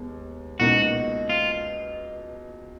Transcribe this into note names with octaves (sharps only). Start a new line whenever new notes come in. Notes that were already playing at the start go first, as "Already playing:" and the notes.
Already playing: D#2 G#3 B3
C#2 B2 A#3 D#4 F#4
F4